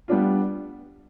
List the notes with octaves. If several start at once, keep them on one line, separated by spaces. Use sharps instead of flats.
G3 B3 D4 F4